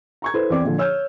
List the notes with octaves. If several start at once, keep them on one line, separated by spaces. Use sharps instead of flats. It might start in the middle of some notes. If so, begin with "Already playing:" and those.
A#5 C#6 G#6
E4 A4 B4 C5
E2 C4 D5 D6
A#2 D3 F3
C#5 E6 F6 G6